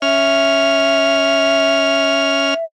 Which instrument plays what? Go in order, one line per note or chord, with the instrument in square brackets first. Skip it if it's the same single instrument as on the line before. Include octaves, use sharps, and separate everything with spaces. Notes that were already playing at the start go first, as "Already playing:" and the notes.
[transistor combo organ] C#4 F6 [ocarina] E5